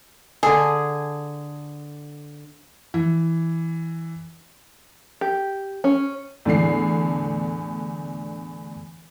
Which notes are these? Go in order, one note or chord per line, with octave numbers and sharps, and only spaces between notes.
D3 G#4 A4
E3
G4
C#4
E2 A2 D3 D4 C7